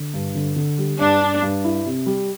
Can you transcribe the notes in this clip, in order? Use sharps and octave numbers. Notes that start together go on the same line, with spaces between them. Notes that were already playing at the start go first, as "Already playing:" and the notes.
Already playing: D3
G2
D3
D3
G3
G2 D4
G2
G2
E4
C3
G3